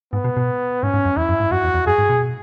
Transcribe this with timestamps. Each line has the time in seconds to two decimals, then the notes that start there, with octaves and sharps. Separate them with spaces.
0.13 G#2 B3
0.24 B2
0.37 B2
0.83 G#2 C#4
0.94 G#2
1.05 F#2
1.17 E2 E4
1.29 F#2
1.40 G#2
1.51 F#2 F#4
1.64 E2
1.74 E2
1.86 F#2 G#4
1.98 G#2
2.09 B2